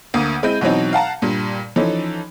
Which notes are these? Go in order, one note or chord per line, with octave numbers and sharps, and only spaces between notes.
D2 A#3 D#6 D#7
G#3 C4 E4 D#5 G6 D#7
B2 E3 F#3 C4 D#4
F5 F#5 A5 A#5
G2 A#2 G3
E3 F3 C#4 D#4 A4